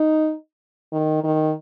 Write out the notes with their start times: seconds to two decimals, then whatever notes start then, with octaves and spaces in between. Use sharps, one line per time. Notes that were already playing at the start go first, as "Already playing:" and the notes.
Already playing: D#4
0.92 D#3
1.24 D#3